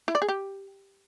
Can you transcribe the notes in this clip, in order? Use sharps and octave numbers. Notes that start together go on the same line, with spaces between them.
E4
D5
G#4
G4